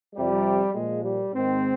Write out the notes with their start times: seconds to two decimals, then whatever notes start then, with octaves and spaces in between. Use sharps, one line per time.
0.15 F2 C3 F3 G3
0.74 A#2 F3 G#3
1.04 G3
1.33 G#2 D#3 C4